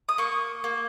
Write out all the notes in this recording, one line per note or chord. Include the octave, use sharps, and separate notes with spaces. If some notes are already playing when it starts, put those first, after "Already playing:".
D#6
A#3 C#6
A#3